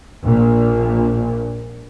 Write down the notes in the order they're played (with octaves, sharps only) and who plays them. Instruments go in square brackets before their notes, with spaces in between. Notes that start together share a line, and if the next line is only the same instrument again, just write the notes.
[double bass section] A#1 A#2